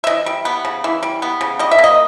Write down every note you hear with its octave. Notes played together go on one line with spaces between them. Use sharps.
E5
E3 D#5
G3
B3
C#3
E3
G3
B3
C#3
G3 D#5
E5
A#3
D#5